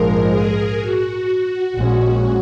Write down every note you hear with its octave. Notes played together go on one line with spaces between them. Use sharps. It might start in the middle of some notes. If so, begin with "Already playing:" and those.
Already playing: A#1 G#2 F3 G#3 A#4
G#4
F#4
A#1 A#2 G#3 C#4